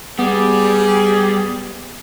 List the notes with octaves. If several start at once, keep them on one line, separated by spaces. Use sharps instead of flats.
G3 B3 G4 G#4